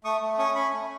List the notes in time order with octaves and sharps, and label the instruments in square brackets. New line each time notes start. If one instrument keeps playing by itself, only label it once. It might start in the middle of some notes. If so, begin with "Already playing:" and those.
[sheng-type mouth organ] A3 C#6 D#6
A3
C#4 C#6 D#6
C#4 B5 C#6
A3